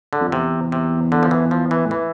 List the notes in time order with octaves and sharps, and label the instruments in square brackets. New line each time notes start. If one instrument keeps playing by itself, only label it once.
[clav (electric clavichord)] D3
[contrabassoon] F2
[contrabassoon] E2 [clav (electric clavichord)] C3
[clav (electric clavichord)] C3
D3
F3
E3
F3
E3
[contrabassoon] A2
[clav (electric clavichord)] E3